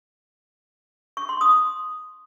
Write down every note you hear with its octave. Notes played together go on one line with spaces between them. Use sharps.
C#6
C6
D#6